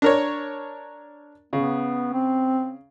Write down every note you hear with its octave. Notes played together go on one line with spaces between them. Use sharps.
D4 A#4 C#5
C#3 B3
C4